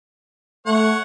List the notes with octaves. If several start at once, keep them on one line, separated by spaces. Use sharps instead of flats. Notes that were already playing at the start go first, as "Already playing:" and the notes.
A3 C#5 F#5